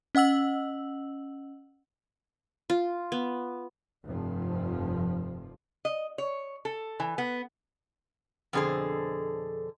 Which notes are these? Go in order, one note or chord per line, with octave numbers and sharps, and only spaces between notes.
C#4 D#5 F#5 E6 F#7
F4
B3
F1 G2 F3
D#5
C#5
A4
E3
B3
F2 B2 D3 G#4 C5